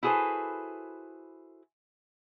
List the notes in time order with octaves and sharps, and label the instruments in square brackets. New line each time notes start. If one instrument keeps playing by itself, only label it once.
[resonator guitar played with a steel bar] E4 F#4 G#4 A4 B4 C5